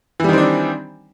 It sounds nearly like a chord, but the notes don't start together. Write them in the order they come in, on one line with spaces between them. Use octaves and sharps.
E3 G3 D#3 C4 D4